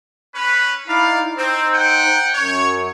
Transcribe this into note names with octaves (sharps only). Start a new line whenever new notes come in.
C#4 B4
D#4 E4 D5 F5
C4 D#4 C5
F#5 G5
F#2 C#5